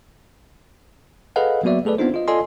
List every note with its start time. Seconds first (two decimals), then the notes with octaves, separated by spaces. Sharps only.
1.36 G#4 A4 B4 D#5 F5 F#5
1.63 F#3 A#3 B3 F#4 D5 E5
1.85 A3 G#4 A4 B4 D5
1.98 B3 C4 D4 D#4 F4 C5
2.14 F4 D#5
2.28 F4 A4 D5 D#5 G#5 C6